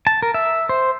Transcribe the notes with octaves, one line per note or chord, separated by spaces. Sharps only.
A5
A#4
E5
C5